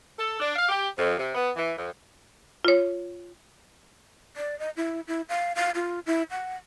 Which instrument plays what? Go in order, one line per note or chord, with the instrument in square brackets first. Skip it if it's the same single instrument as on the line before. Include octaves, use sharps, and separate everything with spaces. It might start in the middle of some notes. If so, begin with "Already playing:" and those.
[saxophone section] A4
D4
F5
G4
F2
C3
B3
E3
F2
[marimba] F4 C#5
[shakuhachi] D5
D#5
E4
E4
F5
F5
F4
E4
F#5